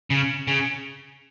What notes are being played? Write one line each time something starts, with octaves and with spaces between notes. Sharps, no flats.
C#3
C#3